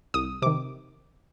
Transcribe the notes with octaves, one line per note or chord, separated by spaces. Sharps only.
C2 D#6
C3 D#3 D6